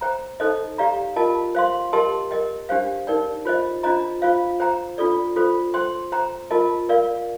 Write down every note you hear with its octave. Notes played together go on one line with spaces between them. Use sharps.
C5 G5 A#5
D#4 A4 C5 D#5
G4 D5 F5 A#5
F4 A#4 D#5 A5
C5 F5 C6
G4 A#4 D#5 A5 C6
A#4 D#5 G5
D4 G4 C5 F5
D#4 A#4 D5 G5
F4 C5 D#5
D4 F4 C5 D#5 A#5
F4 C5 F5
C5 G5 A#5
D4 F4 A4 D5
F4 A4 C5
C5 G5 C6
C5 G5 A#5
F4 A#4 D#5 A5
A#4 D5 F5